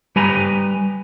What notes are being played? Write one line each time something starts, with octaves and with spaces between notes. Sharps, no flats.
G3 B4 G#5 A#5